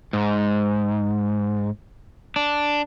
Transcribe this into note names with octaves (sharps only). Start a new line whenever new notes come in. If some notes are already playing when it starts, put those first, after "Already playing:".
G#2
D4